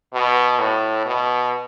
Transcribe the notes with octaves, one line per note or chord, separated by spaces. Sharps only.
B2
A2
B2